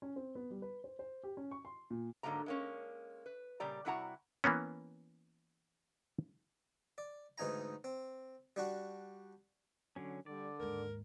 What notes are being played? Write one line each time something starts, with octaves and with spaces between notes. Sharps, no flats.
C#4
C4
B3
G3
B4
C5
C5
G4
C#4
C#6
C6
A#2
G#2 D3 F3 F#3 A#3 A#5
G#3 A#3 C#4
B4
A#2 C#3 G3 D5 A#5
C3 G3 E4 F#4 F#5 A#5
E3 A#3 B3 C#4
D5
D2 G#2 E3 D#4 G#5 A#5
C4
G3 D4 F#4
D3 F#3 C#4
D3 G3 D5
D#2 G#2 A#4